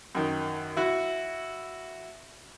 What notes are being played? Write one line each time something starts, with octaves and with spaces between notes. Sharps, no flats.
F#2 D#3
E4 F#4